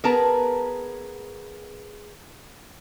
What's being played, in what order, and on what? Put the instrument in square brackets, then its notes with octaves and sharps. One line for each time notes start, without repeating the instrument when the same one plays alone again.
[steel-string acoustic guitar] B3 G#4 B4 [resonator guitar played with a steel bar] A#4 A5 A#5